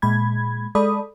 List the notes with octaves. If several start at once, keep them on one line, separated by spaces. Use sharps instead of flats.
A#2 G#3 B5 G#6
G#3 A4 D5 B5 D#6